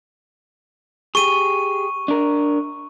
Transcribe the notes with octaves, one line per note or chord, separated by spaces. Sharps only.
G4 G#4 C#6 D#7
D4 A#4